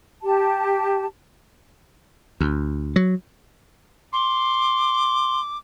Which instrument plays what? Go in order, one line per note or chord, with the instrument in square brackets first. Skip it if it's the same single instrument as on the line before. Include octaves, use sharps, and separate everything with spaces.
[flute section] G4 A5
[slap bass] D2
F#3
[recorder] C6 [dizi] D6